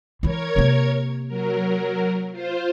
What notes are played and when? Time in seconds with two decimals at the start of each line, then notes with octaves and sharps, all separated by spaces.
0.23 E3 E4 A#4 C#5 G#6
0.56 C3 A#3
1.28 F#3 A#4
2.32 F4 C5